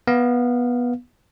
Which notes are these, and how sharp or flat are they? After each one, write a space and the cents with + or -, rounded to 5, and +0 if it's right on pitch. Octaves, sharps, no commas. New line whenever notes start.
B3 -15 F5 +0